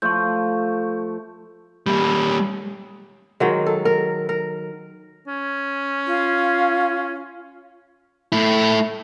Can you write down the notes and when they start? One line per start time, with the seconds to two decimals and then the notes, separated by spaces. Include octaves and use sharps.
0.02 F3 A3 C#6 G6
1.87 G3 A#3
3.40 D#3 F#3 G#3
3.66 A4
3.85 A#4
4.29 A#4
5.27 C#4
6.07 F4
8.32 A3 E4